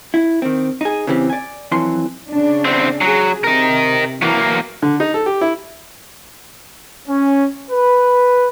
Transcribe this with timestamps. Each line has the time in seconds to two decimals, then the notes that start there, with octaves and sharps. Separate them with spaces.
0.14 E4
0.42 D#3 C4
0.81 D#4 G#4
1.07 C#3 E3 C4 G4
1.30 D5 G#5
1.71 F2 E3 F#3 C6
2.30 C#3 D4
2.65 E2 C4
3.01 F#3 G#4
3.44 C3 A#4 D#5
4.22 E3 F#3 A#3
4.82 D3
5.00 D#4
5.14 A4
5.26 G4
5.41 E4
7.08 C#4
7.70 B4